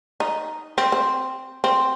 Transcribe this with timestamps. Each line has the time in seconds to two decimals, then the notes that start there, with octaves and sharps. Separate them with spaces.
0.20 D#4
0.78 C4
0.92 C4
1.64 C4